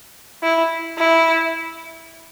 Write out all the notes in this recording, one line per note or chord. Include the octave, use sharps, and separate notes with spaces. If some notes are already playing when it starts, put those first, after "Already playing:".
E4
E4